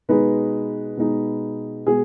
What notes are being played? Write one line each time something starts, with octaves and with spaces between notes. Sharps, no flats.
B2 G#3 D#4 B4
B2 G#3 D#4
B2 G#3 G#4